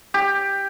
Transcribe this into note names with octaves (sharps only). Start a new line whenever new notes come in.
G4